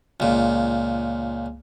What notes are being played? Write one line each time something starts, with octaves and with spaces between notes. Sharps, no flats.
C#2 A#2